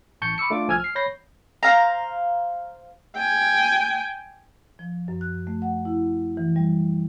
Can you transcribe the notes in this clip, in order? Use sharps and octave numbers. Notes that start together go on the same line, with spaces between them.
A1 A5 C#6 G6 C#7
B5 C#6 D6 E6 C#7
A3 D4 F4 D6
C2 F3 G#5 E6 F6 G#6
F6 C7
C#5 B5 G6 A#6 C7
C5 F5 A#5
G5 G#5
F3
F#2
F#6
A3
F#5
E4
E3
G3